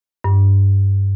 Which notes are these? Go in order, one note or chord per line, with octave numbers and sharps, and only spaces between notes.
G2